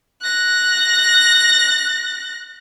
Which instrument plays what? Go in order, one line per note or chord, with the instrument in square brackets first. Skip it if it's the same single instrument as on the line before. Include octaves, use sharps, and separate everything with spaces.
[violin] F#6 A#6